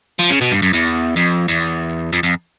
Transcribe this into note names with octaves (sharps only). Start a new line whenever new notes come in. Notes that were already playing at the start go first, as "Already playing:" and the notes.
F3
C#3
B2
G2
F#2
E2
F2
E2
F2
F2